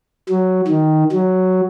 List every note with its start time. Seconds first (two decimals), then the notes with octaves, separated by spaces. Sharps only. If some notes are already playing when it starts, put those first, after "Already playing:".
0.29 F#3
0.67 D#3
1.12 F#3